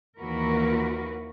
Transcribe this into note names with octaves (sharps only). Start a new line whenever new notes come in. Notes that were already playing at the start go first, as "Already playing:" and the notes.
D#2 E3 A#3 F#4 A#4 B4